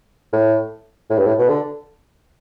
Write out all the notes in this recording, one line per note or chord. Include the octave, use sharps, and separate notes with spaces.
A2
A2
G2
A2
B2
D3